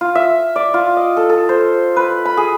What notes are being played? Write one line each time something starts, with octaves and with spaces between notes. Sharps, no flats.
F4
E5
D5
F4
D#5
A4
A4
C5
B4
B5
G#4